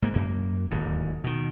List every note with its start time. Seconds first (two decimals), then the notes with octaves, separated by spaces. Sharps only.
0.02 G#2 A#3
0.14 F#2 A#3
0.71 D1 D#2 G#2
1.24 B2 D#3